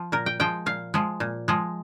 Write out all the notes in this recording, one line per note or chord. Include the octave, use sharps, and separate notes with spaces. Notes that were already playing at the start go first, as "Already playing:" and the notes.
Already playing: F3
A#2 A#4
G5
F3 G#3 G5
A#2 F5
F3 G#3
A#2
F3 G#3